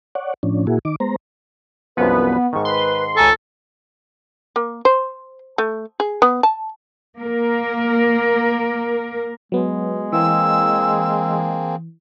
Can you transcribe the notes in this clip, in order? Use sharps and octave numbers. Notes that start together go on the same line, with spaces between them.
C#5 D5 F#5
A2 F3 C#4 D4
A#2 A#3 E4 F#4 G#4
D#3 D#4 D6
G#3 B3 C5 A#5
C2 F#2 F3 B3 B4
G#2 D#3 C#6
B4 C6
C#2 A4 G#5 A#5 C#6
A#3
C5
A3
G#4
B3
A5
A#3 A#4
F#3 G#3 B3
E3 A#3 C4 G#4 E6